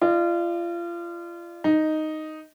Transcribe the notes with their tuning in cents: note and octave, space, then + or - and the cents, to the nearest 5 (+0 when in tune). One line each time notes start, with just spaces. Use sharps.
F4 -30 D5 +40
D#4 +0 D#5 +0